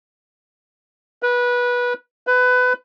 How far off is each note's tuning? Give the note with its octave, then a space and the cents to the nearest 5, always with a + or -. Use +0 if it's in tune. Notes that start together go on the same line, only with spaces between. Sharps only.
B4 -20
B4 +20